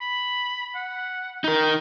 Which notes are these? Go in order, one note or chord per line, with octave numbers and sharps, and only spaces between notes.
B5
F#5
D#4 A#4